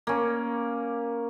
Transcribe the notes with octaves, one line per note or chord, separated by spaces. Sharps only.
A#3 C#4